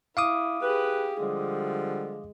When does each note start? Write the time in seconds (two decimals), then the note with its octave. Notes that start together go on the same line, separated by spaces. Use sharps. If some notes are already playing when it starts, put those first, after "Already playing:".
0.17 E4 F5 D6 D#6
0.63 G4 G#4 B4
1.21 D3 F3 G3 G#3